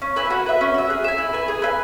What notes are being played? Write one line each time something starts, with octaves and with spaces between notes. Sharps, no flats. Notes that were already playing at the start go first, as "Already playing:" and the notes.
C#4
E4 B4 G#5
F#4
B4 E5
C#4
F#4 E5
G#4
E5 G#5
E4
B4 G#5
G#4
B4 E5 G#5